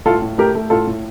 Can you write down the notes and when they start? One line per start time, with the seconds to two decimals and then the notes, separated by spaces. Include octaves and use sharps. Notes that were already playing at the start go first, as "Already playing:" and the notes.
0.05 A2 F4 A4
0.22 A2
0.38 A3 G4 A#4
0.55 A3
0.70 A2 F4 A4
0.87 A2